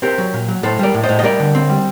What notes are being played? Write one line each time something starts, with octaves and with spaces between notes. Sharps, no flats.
C4 G4 A#4
F#3
A#2
F#3
A2 A4 C5
G3 A#4 D5
A2
C5 D#5
A2
D#5
G3 A#4 D5
D3
C4
G3